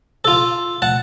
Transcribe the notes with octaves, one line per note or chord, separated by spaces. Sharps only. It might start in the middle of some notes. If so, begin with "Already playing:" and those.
F4 A4
F#5 A5